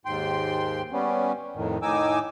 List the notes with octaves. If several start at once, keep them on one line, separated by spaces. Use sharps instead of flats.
D#2 G#2 G5 C6
G3 B3 C#4
F2 A2 D#3
A2 D#3 D#4 G#5 D6 E6